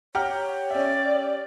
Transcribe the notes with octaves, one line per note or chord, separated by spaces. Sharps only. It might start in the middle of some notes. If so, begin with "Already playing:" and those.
G4 C#5 F#5 A#5 F6
C#4 D5 E5